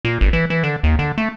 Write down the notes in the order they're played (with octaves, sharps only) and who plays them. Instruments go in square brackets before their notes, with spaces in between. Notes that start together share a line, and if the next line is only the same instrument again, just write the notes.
[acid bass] A#2
G1
E3
E3
D3
D#2
D3
A3